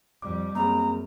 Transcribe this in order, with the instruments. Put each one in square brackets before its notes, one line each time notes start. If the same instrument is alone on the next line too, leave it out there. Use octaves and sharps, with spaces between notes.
[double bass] F2 G3 [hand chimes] D6
[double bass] F#2 [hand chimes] A#3 C4 G#4 [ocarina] A#5